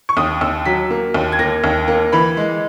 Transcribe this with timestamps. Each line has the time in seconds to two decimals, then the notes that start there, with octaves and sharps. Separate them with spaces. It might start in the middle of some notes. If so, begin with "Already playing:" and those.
0.09 C#6
0.17 D#2 D#6
0.41 D#2 E6
0.66 F#3 B6
0.90 A#3
1.14 D#2
1.32 G#6
1.39 A#3 A#6
1.64 D#2
1.88 A#3
2.12 E3 B5
2.37 G#3